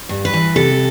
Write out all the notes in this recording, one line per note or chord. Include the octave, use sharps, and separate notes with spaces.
G2
B4
E3
C3 A4